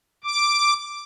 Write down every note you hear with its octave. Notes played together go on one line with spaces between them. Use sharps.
D6